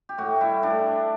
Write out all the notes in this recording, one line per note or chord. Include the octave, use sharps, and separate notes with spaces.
G4
A2 F#4
G3 E4
A2 D4